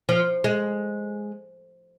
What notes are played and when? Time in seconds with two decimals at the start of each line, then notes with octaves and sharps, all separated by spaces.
0.09 F3
0.44 G#3